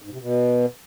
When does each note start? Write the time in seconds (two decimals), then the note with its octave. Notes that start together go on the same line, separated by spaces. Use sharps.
0.02 G#2
0.12 C3
0.21 B2